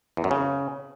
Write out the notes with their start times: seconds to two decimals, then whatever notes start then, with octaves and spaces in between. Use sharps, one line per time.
0.17 E2
0.24 F#2
0.31 C#3